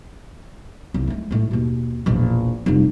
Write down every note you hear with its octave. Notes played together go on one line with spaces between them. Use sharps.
C2
G#3 A3
A2 A3
D#2 B2
E1 A#1
F1 C2